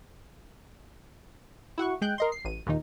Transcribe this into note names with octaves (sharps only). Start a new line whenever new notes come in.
E4 F#4 F#5 C#6
G#3 G5 F#6 G6
A#4 D#5 C6
C7
A1 D#7
D#2 A#2 D#3 D#4